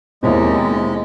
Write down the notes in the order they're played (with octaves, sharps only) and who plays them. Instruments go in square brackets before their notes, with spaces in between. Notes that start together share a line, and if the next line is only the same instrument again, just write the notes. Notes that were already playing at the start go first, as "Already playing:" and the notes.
[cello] D#2 [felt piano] B2 C#5 [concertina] G#3 [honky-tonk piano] C4 E4